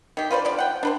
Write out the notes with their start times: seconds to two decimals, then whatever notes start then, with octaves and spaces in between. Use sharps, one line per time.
0.17 D#3 G4
0.31 F4 B4 C5 D5
0.45 D3 F3 D5
0.58 F#5 G5
0.83 D4 B4 C5